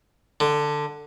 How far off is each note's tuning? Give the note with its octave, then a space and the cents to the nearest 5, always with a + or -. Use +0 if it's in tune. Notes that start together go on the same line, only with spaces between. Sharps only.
D3 +10